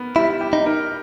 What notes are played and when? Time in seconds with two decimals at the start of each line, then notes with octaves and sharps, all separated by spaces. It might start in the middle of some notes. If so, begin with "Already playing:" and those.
Already playing: B3 A#4
0.15 G3 E4
0.41 G4
0.53 D#4
0.66 A#4